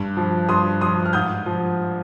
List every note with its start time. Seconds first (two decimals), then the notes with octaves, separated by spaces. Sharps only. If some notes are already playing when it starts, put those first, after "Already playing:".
Already playing: G2
0.17 F3
0.49 G2 C6 D#6
0.81 F3 C6 D#6
1.06 F6
1.13 G#2 D#6 G6
1.46 F3